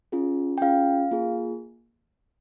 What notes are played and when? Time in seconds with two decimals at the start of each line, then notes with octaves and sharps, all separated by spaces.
0.12 C#4 F4 G#4
0.58 G5
0.61 C#4 F4 G#4 F5
1.11 A#3 F4 G#4